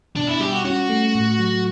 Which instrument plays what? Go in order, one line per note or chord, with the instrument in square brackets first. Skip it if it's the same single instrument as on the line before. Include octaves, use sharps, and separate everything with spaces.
[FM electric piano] B2 [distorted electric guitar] D4
[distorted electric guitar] E4
[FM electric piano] G3 [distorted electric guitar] G4
[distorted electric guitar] F#4
[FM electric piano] C#4 [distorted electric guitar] F#4
[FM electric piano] A3
A2
F#3